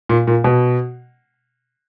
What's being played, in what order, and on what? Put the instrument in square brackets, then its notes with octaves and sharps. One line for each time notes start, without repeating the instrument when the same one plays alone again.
[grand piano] A#2
A#2
B2